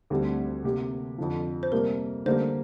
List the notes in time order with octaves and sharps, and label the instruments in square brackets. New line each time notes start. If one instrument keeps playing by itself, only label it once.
[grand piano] D2 D3 G3 C4 G4
C3 A#3 G4
F2 D3 F3
[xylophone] C5
[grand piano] C3 G3 A#3 [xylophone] A#4
[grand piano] D3 G3 A#3 [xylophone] C5